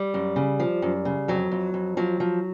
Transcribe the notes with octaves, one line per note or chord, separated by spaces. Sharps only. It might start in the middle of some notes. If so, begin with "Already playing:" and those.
Already playing: G3
F#2
C#3
F3
F#2
C#3
F2 F#3
F2
F2
F3 F#3
F3